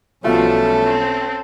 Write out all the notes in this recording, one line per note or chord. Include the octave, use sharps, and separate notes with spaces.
B1 B2 F3 G3 A3 C#4 F4 A4
C4